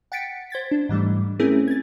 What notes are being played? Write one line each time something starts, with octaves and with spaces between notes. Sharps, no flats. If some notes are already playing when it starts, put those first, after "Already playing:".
F#5 G5 A6 B6 C#7 D7
C5 G#6 A6 B6
D4
G#2 E3 G3 A3
A3 C4 C#4 E4 G#4 A#4
G#6 A6